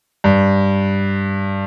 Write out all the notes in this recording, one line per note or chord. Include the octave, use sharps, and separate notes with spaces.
G2